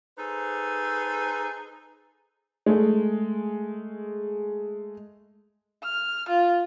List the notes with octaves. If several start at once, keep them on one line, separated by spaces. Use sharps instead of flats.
D#4 G#4 A4 B4 C5
G#3 A3
F6
F4